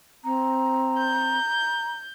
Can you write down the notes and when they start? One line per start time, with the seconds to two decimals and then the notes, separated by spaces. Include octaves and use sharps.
0.24 C4 A#5
0.97 G6